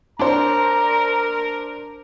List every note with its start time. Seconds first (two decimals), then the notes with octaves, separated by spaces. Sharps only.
0.19 D4 A#4 C5 A#5